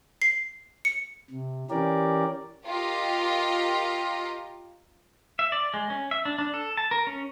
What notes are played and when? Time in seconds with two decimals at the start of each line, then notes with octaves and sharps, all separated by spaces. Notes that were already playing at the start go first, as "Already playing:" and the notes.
0.22 C7
0.85 C#7
1.31 C3
1.70 E3 C#4 G4 A#4 D5
2.65 F4 G4 A#4 D#5
5.39 E5
5.52 D5
5.74 G#3
5.90 C#4
6.11 E5
6.25 D4
6.38 D4
6.54 A4
6.77 A5
6.91 A#4
7.07 C#4